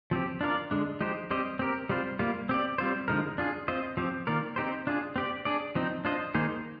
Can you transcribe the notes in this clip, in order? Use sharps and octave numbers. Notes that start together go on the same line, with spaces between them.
F3 C4 G4
D4 F4 A#4 D5
D3 G#3 D4
F3 G#3 D#4 G4 C5
G3 C4 G4 C5 D#5
C4 G4 A#4
G3 C4 F4 C5
G3 A#3 F4
C4 G4 D5
G3 C4 F4 C5
D3 F3 G#3 D#4 A#4
D4 F4 G#4
C4 F4 C5 D#5
F3 C4 G4
D#3 A#3 F4 A#4 D5
C4 D#4 G4 C5
D4 F4 G#4
C4 G4 D5
D4 G#4 D5
F3 C4 D#4
D4 F4 C5 D#5
D#3 A#3 D#4 G#4 C5